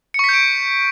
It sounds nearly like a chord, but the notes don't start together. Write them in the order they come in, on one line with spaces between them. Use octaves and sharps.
C#7 C#6 B6 G6 D7